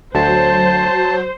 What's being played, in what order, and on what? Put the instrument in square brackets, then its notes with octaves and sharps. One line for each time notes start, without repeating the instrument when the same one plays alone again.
[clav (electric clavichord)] D2 [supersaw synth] F#3 [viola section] C5 [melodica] A5